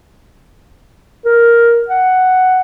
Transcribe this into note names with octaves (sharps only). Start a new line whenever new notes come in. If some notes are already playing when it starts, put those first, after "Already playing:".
A#4
F#5